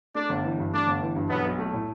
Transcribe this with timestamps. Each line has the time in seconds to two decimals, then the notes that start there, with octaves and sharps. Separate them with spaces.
0.15 A3 D4
0.29 G1
0.44 E3
0.59 G2
0.73 A3 D4
0.87 G1
1.02 E3
1.15 G2
1.30 B1 B3
1.45 B1
1.59 A3
1.73 A2